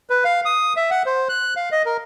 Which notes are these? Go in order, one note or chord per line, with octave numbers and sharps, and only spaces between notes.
B4
F5
D#6
E5
F#5
C5
F#6
F5
D#5
A#4